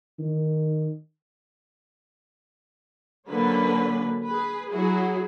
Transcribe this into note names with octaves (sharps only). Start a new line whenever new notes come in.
D#3
D3 F#3 A#3 C#4 B4
G#4 B4
F#3 E4 F#4 G#4